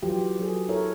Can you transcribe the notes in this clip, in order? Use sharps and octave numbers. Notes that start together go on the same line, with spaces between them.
E3 F#3 F4 G4
F#3 G#4 A4
E4 A4 A#4 C#5